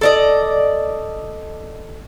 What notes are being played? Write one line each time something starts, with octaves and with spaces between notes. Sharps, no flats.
A4 D5 D#5